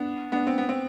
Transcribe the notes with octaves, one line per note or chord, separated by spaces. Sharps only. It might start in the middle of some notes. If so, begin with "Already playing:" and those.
Already playing: B3 D4
B3 D4
C4
B3
C4